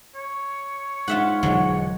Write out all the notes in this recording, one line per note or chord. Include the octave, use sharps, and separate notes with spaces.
C#5
G#2 F4 E5 F#5
E1 D3 F3 F#3 G#3